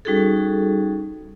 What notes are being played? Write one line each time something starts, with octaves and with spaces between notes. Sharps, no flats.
G3 C#4 D#4 F#4 G#4 A4